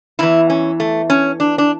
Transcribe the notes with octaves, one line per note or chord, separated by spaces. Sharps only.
E2 E3 E4
C#4
A3
C#4
D4
D4